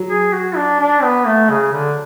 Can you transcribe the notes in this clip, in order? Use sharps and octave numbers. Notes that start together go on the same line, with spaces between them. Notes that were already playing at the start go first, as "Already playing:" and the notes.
Already playing: F#3
G#4
F#4
D4
D4
B3
A3
C#3
D3